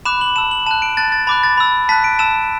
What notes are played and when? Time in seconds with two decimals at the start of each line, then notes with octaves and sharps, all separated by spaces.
0.05 B5 D6 F#6 E7
0.21 F#7
0.36 A5 E6 E7
0.51 F#7
0.66 A5 F#6 E7
0.82 D7
0.97 A5 F#6 A6
1.12 A6
1.27 B5 D6 F#6 A6
1.43 A6
1.58 B5 E6
1.89 A5 F#6 B6
2.04 D7
2.19 A5 E6 E7